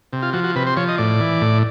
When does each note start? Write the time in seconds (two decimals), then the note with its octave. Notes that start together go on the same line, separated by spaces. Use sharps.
0.13 C3
0.23 F4
0.33 F3 F#4
0.44 F#4
0.56 C3 B4
0.67 C5
0.77 F3 C#5
0.88 D#5
0.98 A2 D5
1.21 E3
1.41 A2